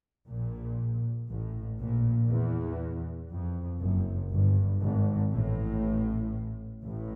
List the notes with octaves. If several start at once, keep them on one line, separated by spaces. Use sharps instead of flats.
A#1 A#2
A1 A2
A#1 A#2
E2
F2
F#1 F#2
G1 G2
G#1 G#2
A1 A2
A1 A2